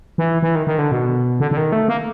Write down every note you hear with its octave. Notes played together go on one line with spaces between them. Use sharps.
E3
E3
D#3
D#3
D3
B2
D3
D3
D#3
A3
A#3